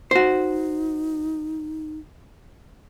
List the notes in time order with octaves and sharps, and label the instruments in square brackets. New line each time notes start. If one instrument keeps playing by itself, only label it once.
[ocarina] D#4 [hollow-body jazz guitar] F#4 C5